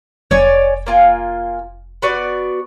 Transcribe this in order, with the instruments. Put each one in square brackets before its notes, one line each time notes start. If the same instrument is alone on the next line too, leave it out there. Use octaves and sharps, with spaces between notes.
[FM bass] F1 [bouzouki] C#5 D5 G#5
[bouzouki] A#3 F4 G#5
B3 F#4 D5